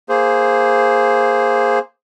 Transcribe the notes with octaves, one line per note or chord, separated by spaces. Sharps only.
A#3 G#4 C5